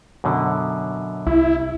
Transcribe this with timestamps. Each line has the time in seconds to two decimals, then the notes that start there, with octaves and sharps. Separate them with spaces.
0.24 F#2 B2 D3
1.27 C2 E4